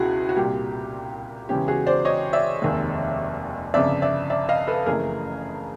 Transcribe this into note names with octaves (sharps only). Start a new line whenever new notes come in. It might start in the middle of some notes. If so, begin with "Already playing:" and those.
Already playing: C#2 B2 E4 F#4 G#4
F#4
C2 A#2 G3 G4
E2 C#3 E3 G#3 C#4 G4
F#4 G#4
C5 D5
C#5 D#5
D5 E5
F1 D#2 D#3 G#3
G1 F2 C#3 D5 E5
D5 E5
D5 E5
D#5 F5
A4 B4
F#1 F2 C#3 E3 A3 G#4 A#4